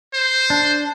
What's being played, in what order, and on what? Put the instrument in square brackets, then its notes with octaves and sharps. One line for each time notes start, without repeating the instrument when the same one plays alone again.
[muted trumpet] C5
[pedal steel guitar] D4